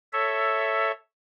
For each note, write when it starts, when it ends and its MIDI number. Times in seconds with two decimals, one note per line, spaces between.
0.13 0.92 69
0.13 0.92 73
0.13 0.92 76